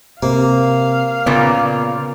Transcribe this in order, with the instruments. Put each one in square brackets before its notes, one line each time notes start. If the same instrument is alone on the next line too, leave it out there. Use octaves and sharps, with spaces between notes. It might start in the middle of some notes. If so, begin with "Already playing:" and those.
[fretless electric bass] C3 [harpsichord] A#3 [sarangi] F5
[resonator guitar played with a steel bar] A#2 C#3 D5 [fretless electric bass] B3